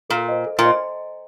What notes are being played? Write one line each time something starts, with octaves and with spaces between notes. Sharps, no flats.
A#2 A4
C5 D#5
A4
A#2
C5 D#5